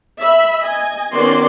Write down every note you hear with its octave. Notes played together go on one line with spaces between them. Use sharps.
E5 B5
D#5 G#5
D#3 B3 C#4 F#4 D5 C6